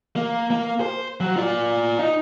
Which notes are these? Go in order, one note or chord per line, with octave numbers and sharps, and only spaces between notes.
A#3
A#3
C5
F#3
F4 D5
D#4